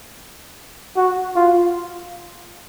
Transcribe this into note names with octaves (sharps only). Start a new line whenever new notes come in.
F#4
F4